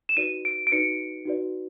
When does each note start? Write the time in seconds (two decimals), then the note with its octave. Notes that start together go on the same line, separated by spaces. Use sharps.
0.09 E7
0.17 D#4 F#4 B4 D5 D#7
0.45 D7
0.67 D7
0.72 D#4 F#4 B4 D5 C#7
1.25 D#4 F#4 B4 D5